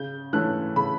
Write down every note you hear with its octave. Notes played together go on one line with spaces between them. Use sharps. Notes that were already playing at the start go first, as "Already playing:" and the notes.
Already playing: C#3 G6
E3 A3 C#4 F#6
C#3 B5